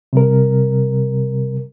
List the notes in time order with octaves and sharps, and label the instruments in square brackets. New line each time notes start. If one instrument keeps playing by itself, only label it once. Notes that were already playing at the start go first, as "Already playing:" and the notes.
[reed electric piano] C3 G3 A#4